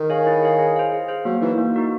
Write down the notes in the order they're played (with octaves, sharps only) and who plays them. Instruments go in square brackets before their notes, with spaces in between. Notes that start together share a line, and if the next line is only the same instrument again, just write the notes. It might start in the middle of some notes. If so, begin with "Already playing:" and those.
Already playing: [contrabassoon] D#3
[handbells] G#4 C#5 F5 G#5
E4
G#4 C#5 F5 G#5
G#4
C5 F5
G#4
C5 F5
[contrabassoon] F#3 [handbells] A#3
[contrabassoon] E3 [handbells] D#4 F#4 A#4
[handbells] A#3
D#4 F#4 A#4